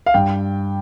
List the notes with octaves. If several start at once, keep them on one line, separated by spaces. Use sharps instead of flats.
F5
G2 G5